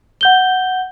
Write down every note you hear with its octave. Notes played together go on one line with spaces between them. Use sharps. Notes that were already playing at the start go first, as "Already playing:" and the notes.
F#5 G6 G7